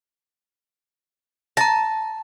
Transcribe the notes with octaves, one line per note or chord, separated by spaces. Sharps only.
A5 A#5 A#6